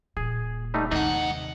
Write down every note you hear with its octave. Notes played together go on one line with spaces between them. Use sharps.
D#1 A#2 G#4
G3 A3 D#4
D#2 G#2 C3 D#4 F#5